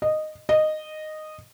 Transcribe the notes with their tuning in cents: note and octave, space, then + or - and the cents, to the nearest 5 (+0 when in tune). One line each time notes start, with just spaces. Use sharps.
D#5 -10
D#5 -10